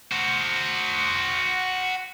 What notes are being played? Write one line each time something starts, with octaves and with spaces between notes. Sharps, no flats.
F#4 C5